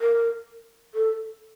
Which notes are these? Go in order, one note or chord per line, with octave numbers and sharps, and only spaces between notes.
A#4
A4